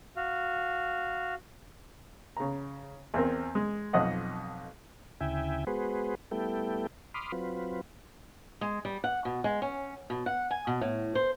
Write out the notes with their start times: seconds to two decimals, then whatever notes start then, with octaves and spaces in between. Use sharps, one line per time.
0.17 F#4 F5
2.37 C#3 A#5
3.14 E2 C4 A#4
3.55 G#3
3.93 B1 F2 D#5 F#5
5.20 D2 C#3 E4 E5 G5 G#5
5.67 G#3 B3 F#4 G#4 B4 C5
6.31 G3 A3 B3 E4 A4 G5
7.14 B5 C6 D6 D#6 F6
7.32 F#3 C4 F4 B4
8.61 G#3
8.85 G3
9.04 F#5
9.25 B2
9.44 G#3
9.62 C#4
10.10 B2
10.26 F#5
10.51 G#5
10.67 B2
10.81 A2
11.15 C5